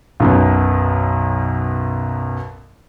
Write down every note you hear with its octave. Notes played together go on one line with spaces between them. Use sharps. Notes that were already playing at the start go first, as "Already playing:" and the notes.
B1 F#2 B2